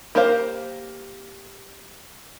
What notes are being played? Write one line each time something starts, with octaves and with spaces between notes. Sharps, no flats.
A#3 G4 A#4 C5 F5